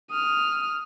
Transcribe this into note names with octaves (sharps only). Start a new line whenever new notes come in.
D#6 F6